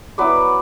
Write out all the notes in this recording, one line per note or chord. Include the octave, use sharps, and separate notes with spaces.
F#3 B3 E4 B4 D5